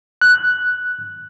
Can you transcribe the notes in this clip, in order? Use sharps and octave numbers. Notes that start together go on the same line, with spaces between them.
F#6